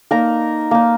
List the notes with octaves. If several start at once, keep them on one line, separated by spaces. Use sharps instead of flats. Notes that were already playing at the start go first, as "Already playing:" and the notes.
A#3 D#4 A#4 A#5
A#3 D#4